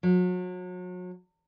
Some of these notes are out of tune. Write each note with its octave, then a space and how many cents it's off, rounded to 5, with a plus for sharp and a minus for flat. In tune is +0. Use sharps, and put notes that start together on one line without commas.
F#3 -35